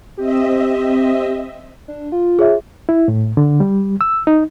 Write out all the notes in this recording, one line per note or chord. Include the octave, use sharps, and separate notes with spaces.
C4 G4 D#5 E5
D4
F4
G#4 C#5 E5
E4
A2
D3
G3
E6
D#4